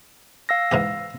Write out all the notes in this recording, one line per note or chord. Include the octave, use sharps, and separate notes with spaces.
F5 E6 A#6
G#2 E3 G4